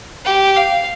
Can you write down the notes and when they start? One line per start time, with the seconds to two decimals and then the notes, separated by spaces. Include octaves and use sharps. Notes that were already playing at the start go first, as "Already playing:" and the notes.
0.26 G4
0.57 F5